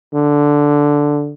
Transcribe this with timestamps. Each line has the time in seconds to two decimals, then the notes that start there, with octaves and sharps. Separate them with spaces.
0.14 D3